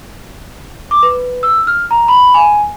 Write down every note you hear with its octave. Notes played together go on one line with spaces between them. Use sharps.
D6
B4
E6
F6
A#5
B5
G#5